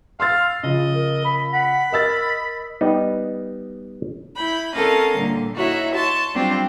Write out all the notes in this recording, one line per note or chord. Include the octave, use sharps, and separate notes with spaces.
F5 C6 E6 A6
C#3 F3 D#5
A#4
B5
F#5 B5
A#4 D#5 E6 A6
G3 B3 D#4
E4 B5 G6
C4 C#4 A4 A#4 D#5 F5
A#2 D3 G3
D#4 E4 F#4 C#5 E5
A5 C6 C#6
F#3 G3 C4 D4 F4 G4